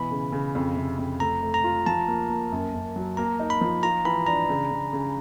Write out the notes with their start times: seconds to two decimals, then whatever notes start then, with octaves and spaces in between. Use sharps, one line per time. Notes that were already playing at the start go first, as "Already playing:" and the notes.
Already playing: B2 E3 B5
0.11 C#3
0.32 C#3
0.55 F2
0.77 C3
0.99 F2
1.20 A3 A#5
1.43 A3
1.54 A#5
1.64 F4
1.86 F3 A5
2.08 A#3
2.30 A#3
2.52 F#2
2.74 F#2
2.96 F#3
3.17 A#3 A#5
3.40 D#4
3.50 B5
3.61 F3
3.83 F4 A#5
4.05 E3 B5
4.27 D4 A#5
4.49 C#3
4.71 C#3
4.93 C#3